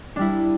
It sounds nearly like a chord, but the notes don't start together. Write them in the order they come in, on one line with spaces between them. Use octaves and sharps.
D4 G3 E4